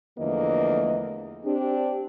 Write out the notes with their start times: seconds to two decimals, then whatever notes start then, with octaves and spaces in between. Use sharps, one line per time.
0.19 E2 D3 F3 A3 A#3 D#5
1.45 C4 D4 G4